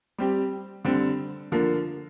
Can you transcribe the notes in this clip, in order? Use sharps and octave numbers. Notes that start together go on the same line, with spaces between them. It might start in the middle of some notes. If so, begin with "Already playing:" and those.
G3 C4 G4
D3 G3 C4
D3 F3 A#3